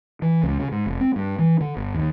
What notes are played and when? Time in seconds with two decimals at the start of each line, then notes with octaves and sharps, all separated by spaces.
0.22 E3
0.43 C#2
0.59 C#3
0.72 G#2
0.86 F1
1.01 C4
1.16 G2
1.39 E3
1.61 D3
1.76 G1
1.95 D#2